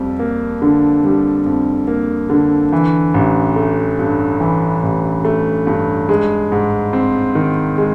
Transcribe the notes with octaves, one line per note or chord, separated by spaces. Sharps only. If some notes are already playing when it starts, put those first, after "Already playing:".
Already playing: F2 G3
A#3
D3
G3
F2
A#3
D3
E3
A1
A3
G2
E3
A1
A3
G2
G#3
G#2
C4
D#3
G#3